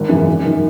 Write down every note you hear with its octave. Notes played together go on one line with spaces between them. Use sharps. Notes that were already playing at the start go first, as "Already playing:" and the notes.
Already playing: G#1
F#2 C#3 E3
G#1
F#2 D#3